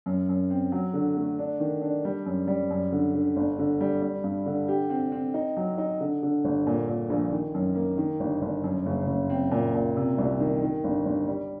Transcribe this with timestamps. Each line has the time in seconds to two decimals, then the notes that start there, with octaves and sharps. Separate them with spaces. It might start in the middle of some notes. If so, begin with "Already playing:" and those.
0.06 F#2
0.29 F#2
0.50 C4
0.72 F#3
0.94 D3
1.17 A3
1.39 D4
1.60 D#3
1.82 D4
2.05 G3
2.26 F#2
2.48 G3
2.70 F#2
2.92 D3
3.14 D3
3.36 G1
3.59 D3
3.81 G3
4.02 G3
4.24 G2
4.46 D3
4.68 G4
4.90 C4
5.12 C4
5.34 D#4
5.57 F#3
5.78 D#4
6.00 D3
6.23 D3
6.45 G1
6.67 A#2
6.89 A#2
7.10 A#1
7.31 D#3
7.54 F#2
7.75 A#3
7.98 D#3
8.20 G1
8.42 G1
8.64 F#2
8.86 F#1
9.07 F#1
9.30 C4
9.51 A#2
9.75 A#2
9.97 C3
10.18 C2
10.40 D#3
10.62 D#3
10.84 G1
11.05 G1
11.27 G3